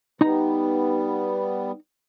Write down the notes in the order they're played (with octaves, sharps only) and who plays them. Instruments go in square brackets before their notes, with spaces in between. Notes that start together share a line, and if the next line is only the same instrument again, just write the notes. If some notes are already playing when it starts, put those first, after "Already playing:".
[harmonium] G3 B3 [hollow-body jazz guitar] D#4 A#5